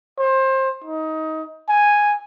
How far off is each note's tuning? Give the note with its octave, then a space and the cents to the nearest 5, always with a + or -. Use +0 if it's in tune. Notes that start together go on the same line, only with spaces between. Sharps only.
C5 +25
D#4 +20
G#5 -5